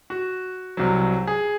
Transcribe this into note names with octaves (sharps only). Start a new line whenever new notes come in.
F#4
C2 C3 F#3
G#4